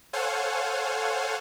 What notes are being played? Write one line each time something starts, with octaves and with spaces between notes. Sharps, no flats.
A4 C5 C#5 F5 F#5 G#5